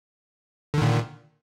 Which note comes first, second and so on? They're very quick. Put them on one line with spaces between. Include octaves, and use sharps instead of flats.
D3 D#3 A#2